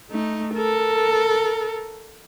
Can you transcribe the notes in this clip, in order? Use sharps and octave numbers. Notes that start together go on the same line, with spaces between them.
A3 D#4
A4 A#4